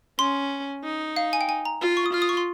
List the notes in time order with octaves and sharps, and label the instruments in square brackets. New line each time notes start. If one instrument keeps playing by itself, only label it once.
[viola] C#4 [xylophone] C6
[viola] D#4
[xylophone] F5
G#5
G5
G#5
A#5
[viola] F4
[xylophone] C#6
D#6
[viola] F4 [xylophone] F6
[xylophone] D#6
C#6
C6